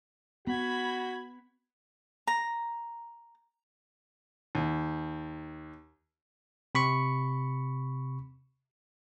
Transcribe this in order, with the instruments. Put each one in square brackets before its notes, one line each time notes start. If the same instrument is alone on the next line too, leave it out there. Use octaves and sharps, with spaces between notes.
[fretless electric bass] B3 [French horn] F#4 [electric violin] B5 G#6
[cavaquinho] A#5
[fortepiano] D#2
[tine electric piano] C3 B5 C#6 C#7